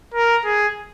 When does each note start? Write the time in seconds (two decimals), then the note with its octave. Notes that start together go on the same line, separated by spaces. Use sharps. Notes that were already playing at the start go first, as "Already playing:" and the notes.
0.14 A#4
0.45 G#4